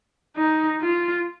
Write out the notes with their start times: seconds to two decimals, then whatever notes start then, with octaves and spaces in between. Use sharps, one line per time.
0.37 D#4
0.81 F4